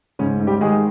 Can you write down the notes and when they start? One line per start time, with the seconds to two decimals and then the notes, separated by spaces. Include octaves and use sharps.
0.19 G#2 C#3 C#4
0.40 G#2
0.47 G3 G4
0.61 D#3 G#3 G#4